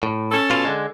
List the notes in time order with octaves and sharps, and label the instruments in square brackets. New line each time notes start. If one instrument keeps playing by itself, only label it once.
[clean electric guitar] A2
[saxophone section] C#4 A4
[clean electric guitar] B2 F4
D3 G#3